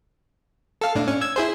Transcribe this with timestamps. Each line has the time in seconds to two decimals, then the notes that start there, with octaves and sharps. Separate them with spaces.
0.81 A4 F5
0.95 A2 D4
1.08 C#4
1.21 E6 G#6
1.36 E4 G#4 C5